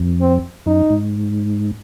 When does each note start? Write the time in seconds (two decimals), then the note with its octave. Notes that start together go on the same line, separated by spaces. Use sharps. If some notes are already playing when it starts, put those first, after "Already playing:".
Already playing: F2
0.20 C4
0.66 F#2 D#4
0.90 G#2